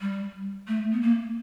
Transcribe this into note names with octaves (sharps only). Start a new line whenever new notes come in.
G3
A3
B3
A#3